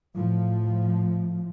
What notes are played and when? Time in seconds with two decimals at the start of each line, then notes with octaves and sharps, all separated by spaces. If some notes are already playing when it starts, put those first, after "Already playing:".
0.16 A2 F3